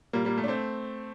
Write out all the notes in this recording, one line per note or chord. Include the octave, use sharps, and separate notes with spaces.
A#2 G3 A#3
G3 A#3
A3
D4
A3 C4